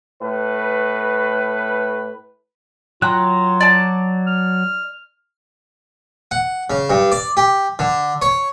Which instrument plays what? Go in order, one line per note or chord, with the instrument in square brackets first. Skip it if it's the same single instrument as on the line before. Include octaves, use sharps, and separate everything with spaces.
[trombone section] A2 B4
[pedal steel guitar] F#3 G5 A#5 [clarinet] F4 [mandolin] F#6
[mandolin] D5 A5
[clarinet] F6
[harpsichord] F#5
C#3
G2
D5
G4
D3
C#5